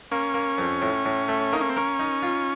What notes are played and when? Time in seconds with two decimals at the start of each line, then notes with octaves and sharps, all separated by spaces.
0.12 A#3 C#4
0.34 A#3
0.58 F2
0.82 A2
1.05 A2
1.28 A3
1.52 A#3 D#4
1.61 C#4
1.70 C4
1.76 C#4 A#4
1.99 D#4
2.23 F4